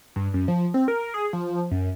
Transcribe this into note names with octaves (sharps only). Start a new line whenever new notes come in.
G2
F#2
F3
C4
A#4
G#4
F3
F#2